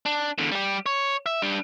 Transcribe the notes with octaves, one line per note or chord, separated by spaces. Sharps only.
D4
E2 D3
G3 G4
C#5
E5
G3 D4